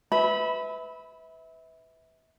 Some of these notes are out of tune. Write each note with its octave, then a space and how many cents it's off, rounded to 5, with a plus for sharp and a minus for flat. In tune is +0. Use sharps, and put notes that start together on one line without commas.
B4 +20 E5 -25 B5 +0